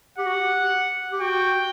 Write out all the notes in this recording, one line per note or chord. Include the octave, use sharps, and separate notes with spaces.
G4 F#5
F#4
G4
G4
F#4 G5